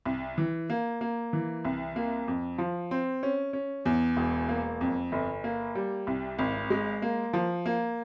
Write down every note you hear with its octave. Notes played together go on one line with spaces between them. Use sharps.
C2
E3
A#3
A#3
E3
C2
A#3
F2
F3
C4
C#4
C#4
E2
E1
A#3
F2
G1
A#3
G3
C2
G#1
G#3
A#3
F3
A#3